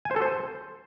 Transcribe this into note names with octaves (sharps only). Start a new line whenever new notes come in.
G#5
C5
A4
C5